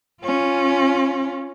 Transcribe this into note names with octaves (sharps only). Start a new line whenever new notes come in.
C#4 F4